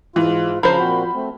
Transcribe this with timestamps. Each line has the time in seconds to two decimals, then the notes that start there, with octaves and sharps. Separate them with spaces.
0.16 G#2 E3 F4
0.63 C#3 F3 C5 A#5 B5
0.78 A#2 C4 F#4
1.14 A3 C4